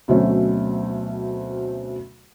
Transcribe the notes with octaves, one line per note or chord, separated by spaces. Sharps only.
D2 B2 F#3 A3 C4 C#4